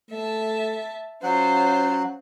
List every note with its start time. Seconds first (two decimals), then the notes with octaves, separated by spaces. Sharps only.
0.11 A3 E5 A5
1.23 F#3 C#4 F4 C5 F#5